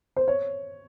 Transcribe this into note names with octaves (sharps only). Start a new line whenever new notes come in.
C5
C#5